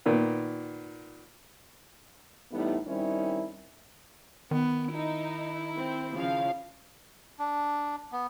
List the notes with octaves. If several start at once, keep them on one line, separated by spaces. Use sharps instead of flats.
A#2 D#3 B3
A2 E3 G3 B3 D#4 E4
D#3 G3 C4 C#4 D#4 E4
D#3 B3
D#4 E4
C4
C#3 F3 F5
D4
B3